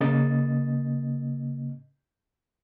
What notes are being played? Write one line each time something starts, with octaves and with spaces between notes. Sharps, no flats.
C#3 A#3 D#5 A6